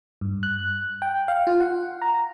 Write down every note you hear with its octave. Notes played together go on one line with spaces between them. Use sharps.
G2
F#6
G5
F5
F4
F#5
A#5